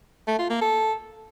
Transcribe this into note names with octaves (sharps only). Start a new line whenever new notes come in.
A3
F4
A#3
A4